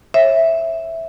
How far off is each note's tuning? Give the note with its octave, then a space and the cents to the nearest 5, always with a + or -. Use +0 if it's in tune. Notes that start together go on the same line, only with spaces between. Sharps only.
C#5 -35 E5 +0